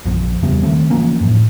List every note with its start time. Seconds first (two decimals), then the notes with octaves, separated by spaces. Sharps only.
0.05 A#1 F#2 F3
0.43 E2 C#3 G3 B3
0.62 D#3 A3 C4
0.90 E3 F3 A#3 C#4
1.21 F#2 A2